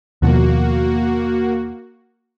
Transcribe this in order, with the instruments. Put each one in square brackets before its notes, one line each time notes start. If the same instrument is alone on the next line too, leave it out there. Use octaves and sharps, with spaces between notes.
[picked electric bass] D#2 B2 F3 [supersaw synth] A#3 F#4